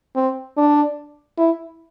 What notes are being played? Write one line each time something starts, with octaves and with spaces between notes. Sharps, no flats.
C4
D4
E4